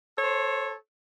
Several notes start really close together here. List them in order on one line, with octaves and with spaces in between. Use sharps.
A4 C#5 C5